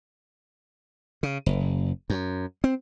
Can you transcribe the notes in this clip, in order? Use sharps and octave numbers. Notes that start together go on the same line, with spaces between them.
C#3
F#1
F#2
C4